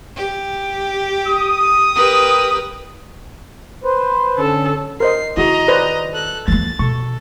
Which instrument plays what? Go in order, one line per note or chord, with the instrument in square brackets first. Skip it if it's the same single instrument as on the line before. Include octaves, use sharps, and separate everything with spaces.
[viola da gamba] G4
[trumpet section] D#6
[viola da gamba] G4 A#4 B4
[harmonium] B4 C5
[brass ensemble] D3 C#4 [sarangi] A4
[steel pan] A#4 C5 D#5 [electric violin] C7
[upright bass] D#3 [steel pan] E4 F#4 G#4 [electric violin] D#5 A#5
[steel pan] B4 C5 D5
[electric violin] A4 F#6
[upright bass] E3 A#3 [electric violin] A6
[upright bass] B2 [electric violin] A4 [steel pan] C#6